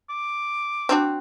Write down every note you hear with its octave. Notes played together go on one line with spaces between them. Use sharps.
D6
C4 D4 F#4